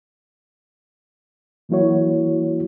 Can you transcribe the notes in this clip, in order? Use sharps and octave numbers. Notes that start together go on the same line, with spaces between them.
E3 F#3 A#3 E4 F#4 C#5